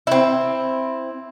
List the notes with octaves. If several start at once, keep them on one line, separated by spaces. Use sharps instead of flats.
C4 E4